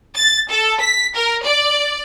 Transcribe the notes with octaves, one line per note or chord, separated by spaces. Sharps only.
A6
A4
B6
A#4
D5